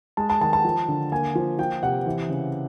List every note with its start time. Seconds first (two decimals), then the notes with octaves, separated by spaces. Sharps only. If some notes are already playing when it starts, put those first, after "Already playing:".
0.17 G#3 A5
0.30 A5
0.41 D#3 A5
0.53 A5
0.65 F3
0.88 D3
1.12 A#3 G#5
1.35 F3
1.59 F3 G5
1.83 C3 F#5
2.06 E3
2.29 C#3